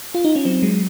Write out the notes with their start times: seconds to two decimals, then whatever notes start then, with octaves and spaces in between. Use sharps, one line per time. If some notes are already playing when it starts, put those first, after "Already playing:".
0.15 F4
0.25 D#4
0.36 C#4
0.45 F#3 C4
0.62 F#3 G#3